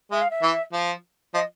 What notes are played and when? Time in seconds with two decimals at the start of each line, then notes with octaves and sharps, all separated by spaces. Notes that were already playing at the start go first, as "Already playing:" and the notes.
0.11 G#3 E5
0.21 F5
0.30 E5
0.42 E3
0.73 F3
1.34 F3 D#5